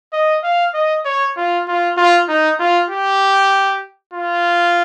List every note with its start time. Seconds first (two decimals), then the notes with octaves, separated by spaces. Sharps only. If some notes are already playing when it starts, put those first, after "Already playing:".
0.13 D#5
0.43 F5
0.74 D#5
1.05 C#5
1.37 F4
1.68 F4
1.97 F4
2.28 D#4
2.59 F4
2.90 G4
4.14 F4